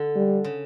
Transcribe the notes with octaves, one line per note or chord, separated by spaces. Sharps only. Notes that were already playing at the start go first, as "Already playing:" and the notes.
Already playing: D3
G3
C#3